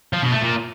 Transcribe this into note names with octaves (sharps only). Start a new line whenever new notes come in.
F3
B2
A3
A#2